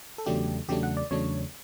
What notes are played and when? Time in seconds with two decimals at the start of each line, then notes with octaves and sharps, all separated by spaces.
0.18 A4
0.26 E2 C#3 F#3 A3 D4 G4
0.68 E2 C#3 F#3 A3 D4 G4
0.83 F#5
0.97 D5
1.11 E2 C#3 F#3 A3 D4 C#5